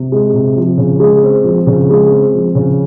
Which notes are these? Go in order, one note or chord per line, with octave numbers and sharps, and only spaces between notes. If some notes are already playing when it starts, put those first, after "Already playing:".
Already playing: C3
G#3
C3
F3
C#3
G#3
C4
F3
C#3
G#3
C4
F3
C#3